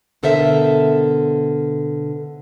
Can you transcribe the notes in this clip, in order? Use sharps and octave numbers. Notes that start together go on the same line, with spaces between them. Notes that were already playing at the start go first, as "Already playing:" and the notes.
B2 D3 A4 A#4 C5 E5